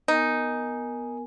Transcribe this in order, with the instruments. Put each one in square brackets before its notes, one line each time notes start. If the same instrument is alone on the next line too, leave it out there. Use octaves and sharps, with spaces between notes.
[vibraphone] B3 A#4 G#5 [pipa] D#4